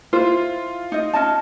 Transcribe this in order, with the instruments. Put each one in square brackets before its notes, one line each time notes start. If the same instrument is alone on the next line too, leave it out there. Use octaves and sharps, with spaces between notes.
[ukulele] E4 C5 [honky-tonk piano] F4
[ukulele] D#4 D#5
C#4 D#5 A5